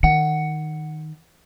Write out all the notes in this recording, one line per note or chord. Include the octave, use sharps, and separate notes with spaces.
D#3 F#5 C#7